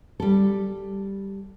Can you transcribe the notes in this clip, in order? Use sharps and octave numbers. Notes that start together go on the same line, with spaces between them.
G3 A4